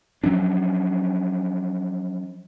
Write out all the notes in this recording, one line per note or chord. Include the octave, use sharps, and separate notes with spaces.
F3 F#3 C#4 D4